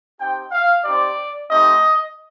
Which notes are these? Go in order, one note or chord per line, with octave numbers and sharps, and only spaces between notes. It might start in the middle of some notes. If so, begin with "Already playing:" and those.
C4 D#4 G4 G5
F5
C4 D#4 G4 D5
A3 C4 D#4 G4 D#5